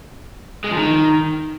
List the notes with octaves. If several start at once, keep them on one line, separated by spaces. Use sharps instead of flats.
G#3
F3
D#3